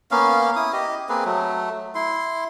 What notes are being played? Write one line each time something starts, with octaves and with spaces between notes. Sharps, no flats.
A#3 B3 C#4 F5
E4 D#6
G4 D#5
A#3 C4 G#4 B4
F#3 A3
E4 C6